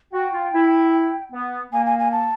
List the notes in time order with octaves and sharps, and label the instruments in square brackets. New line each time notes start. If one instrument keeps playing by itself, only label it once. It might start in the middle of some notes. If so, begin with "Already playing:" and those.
[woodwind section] F#4 [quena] G5
[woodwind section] F4
E4
B3
[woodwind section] A#3 [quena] G#5
[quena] G#5
G#5
A5